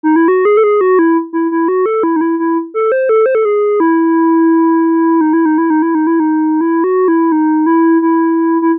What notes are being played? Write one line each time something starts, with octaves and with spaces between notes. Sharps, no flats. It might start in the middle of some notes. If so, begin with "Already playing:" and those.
D#4
E4
F#4
G#4
A4
G#4
F#4
E4
E4
E4
F#4
A4
E4
D#4
E4
E4
A4
C5
A4
C5
A4
G#4
E4
D#4
E4
D#4
E4
D#4
E4
D#4
E4
D#4
E4
F#4
E4
D#4
E4
E4
E4